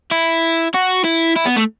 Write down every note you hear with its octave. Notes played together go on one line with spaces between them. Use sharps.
E4
F#4
E4
E4
B3
A3